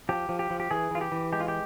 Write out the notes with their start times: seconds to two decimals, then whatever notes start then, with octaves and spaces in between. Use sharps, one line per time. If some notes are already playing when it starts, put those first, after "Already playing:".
0.09 F3 G4
0.29 F3
0.39 G4
0.50 F3
0.60 G4
0.71 E3 G#4
0.91 E3 F4
1.01 G4
1.12 E3
1.33 G#3 G4
1.40 F4
1.48 G4